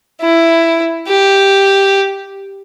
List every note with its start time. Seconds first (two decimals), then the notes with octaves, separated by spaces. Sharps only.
0.21 E4
1.08 G4